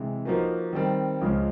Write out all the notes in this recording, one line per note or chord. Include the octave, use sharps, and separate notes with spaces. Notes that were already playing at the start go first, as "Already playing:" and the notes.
Already playing: C3 E3 G#3
F3 A#3 D#4 F#4 B4
D#3 G3 C4
C#2 C#3 F3 G#3